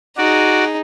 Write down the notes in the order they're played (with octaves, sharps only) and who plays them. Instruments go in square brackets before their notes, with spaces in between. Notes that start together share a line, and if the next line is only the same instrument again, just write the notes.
[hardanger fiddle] D#4 G#4 [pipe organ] F#4 D5